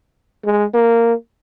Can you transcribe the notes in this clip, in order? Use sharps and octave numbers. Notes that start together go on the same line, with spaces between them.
G#3
A#3